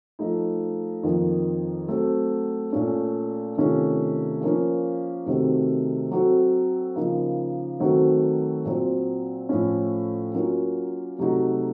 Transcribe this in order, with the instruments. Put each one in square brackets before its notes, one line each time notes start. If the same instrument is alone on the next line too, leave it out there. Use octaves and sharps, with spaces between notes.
[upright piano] F3 A3 D#4
F2 D#3 A#3 F4
F#3 A3 C4
A#2 A3 C#4
C3 D#3 A3 C#4 F4
F3 A#3 C#4
C3 D#3 A3 C4 F#4
F#3 C4 F#4 A4
C#3 F3 A#3 D#4
D#3 F#3 A3 C4 F#4
A#2 F#3 C4
A2 F3 A3 C#4
F#3 A#3 C#4 F4
C3 F#3 A3 D#4 F#4